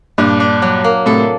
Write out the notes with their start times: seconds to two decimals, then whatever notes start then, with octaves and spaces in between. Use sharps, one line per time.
0.18 G2 A#2 D4
0.40 D4
0.62 F#3
0.84 A#3
1.06 A2 C3 A4